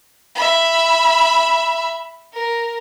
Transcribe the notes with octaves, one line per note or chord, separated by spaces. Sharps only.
E5 B5
A#4